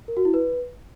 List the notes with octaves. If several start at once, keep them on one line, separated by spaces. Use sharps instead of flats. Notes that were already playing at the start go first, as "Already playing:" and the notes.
A#4
F#4
E4
B4